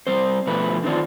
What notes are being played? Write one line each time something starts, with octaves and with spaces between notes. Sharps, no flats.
G3 C4 C5
B2 D3 F3 A3 B4
D3 D#3 C4 D4 F4